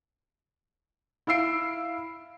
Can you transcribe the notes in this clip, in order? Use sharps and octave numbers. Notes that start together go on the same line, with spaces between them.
E4 F5 E6 C7 D7